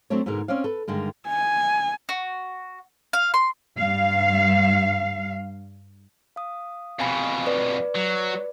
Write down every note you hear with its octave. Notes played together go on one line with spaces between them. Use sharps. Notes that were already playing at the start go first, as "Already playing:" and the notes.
F#3 A3 C4 D4 C#5
G#2 B2 D3 G#3 A#4
C4 C#4 C#5 D5 F5
A4 B4
G2 D3 D#3 G#3
G#5
F#4
F5
C6
G2 F5
F5 D#6
F2 B2 F5 G#5 B5
B4 D5
F#3